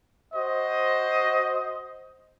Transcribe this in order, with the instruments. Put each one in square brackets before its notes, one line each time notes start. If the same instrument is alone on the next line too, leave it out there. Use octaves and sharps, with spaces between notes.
[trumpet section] F#4 C5 D#5